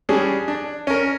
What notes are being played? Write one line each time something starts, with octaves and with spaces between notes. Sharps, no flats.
G3 C#4 D4 G#4
D4
C#4 A#4